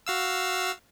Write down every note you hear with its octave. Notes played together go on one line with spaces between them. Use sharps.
F#4 F5 E6